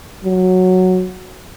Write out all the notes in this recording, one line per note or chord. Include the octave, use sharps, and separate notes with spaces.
F#3